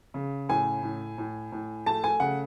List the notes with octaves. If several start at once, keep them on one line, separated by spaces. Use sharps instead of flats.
C#3
A2 G#5
A2
A2
A2
A3 A5
G#5
C#3 F#5